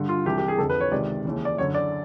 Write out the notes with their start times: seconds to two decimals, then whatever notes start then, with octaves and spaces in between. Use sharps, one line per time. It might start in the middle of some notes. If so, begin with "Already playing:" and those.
Already playing: G2 D3
0.09 F4
0.26 C2 C3 E3 G4
0.38 G4
0.48 G#4
0.58 F2 D3 A4
0.70 B4
0.80 C#5
0.91 C#2 C3 D#3 D5
1.25 D#2 C#3 E3
1.45 D5
1.58 F#2 C#5
1.61 D3
1.74 D5